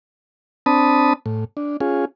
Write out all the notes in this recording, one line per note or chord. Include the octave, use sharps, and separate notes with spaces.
C4 D4 A5 B5 D#6
A2
D4
C#4 F4 G#4